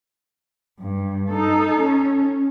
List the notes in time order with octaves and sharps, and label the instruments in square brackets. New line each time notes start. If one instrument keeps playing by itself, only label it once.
[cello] G2
D#4 A4
C#4